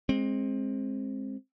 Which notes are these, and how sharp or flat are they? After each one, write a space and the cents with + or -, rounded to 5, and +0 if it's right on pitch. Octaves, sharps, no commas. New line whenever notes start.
G#3 +0 C4 +20